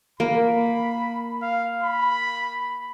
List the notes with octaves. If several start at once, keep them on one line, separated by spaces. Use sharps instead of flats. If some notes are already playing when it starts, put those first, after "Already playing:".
A#3 B5
F5
B5